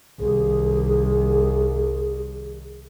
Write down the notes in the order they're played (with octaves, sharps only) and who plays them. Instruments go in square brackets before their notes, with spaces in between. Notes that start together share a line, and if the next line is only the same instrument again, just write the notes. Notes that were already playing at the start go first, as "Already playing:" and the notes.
[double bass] C2 D#3 [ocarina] G#4